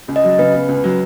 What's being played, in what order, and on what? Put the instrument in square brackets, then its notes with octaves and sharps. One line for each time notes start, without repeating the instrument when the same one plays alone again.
[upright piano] C#2
[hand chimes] D#5
[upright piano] F#3
[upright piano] C#3 [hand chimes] B4
[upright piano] B3
C#2
F#3